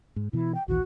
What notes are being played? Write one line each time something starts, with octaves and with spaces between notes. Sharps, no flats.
G#2
B2 E3 E4
G5
A#1 D#2 E3 F#4